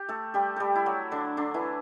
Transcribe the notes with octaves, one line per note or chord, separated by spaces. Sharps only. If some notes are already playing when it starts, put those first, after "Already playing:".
Already playing: G4
A3 A4
G3 G4
G3 G4 A4
E4
F#3 F#4
D3 D4
D3 D4
E3 E4